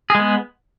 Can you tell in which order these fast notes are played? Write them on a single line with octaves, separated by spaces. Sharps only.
G#4 G#3 B3